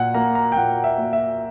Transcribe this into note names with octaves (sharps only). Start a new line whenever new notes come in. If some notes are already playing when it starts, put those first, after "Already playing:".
Already playing: A#2 F#5
A#3 A#5
A#5
G5
A#2 F#5
E5
A#3
E5